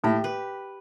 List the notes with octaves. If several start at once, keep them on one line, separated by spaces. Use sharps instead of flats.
A2 G4
B4